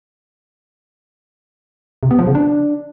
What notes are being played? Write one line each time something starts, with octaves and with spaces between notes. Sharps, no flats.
C3
B3
F3
C#3
D4